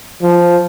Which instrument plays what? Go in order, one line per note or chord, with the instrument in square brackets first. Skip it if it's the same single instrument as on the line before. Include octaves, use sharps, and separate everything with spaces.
[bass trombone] F3